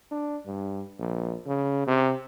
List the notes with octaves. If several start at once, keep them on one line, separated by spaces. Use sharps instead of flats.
D4
G2
A#1
C#3
C3